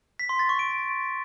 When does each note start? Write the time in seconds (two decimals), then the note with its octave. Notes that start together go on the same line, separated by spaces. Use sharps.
0.19 B6
0.29 C6
0.39 A6
0.49 C#6
0.59 D7